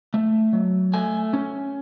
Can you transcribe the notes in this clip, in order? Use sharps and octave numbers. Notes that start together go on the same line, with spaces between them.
A3
F#3
A3 G#5
C#4